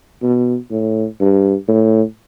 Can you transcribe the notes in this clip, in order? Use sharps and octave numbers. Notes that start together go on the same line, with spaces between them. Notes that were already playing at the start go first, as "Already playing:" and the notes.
B2
A2
G2
A2